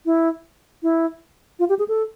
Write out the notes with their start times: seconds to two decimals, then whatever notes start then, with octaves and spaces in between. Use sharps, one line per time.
0.06 E4
0.83 E4
1.59 F4
1.69 G4
1.79 G#4
1.88 A4